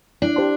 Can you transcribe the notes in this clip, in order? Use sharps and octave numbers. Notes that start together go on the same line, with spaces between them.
D4 E4
G4 C5 A5 C6